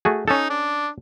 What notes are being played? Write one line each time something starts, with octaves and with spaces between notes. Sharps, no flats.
A3 F#4 G#4
C#4 D#4 A4
D4